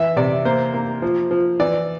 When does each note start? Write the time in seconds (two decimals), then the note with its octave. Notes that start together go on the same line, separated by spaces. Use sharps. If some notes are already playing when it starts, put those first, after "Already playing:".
Already playing: E3 E5
0.16 C3 D5
0.45 A#3 C5
0.74 A#3
1.02 F3
1.31 F3
1.59 E3 D5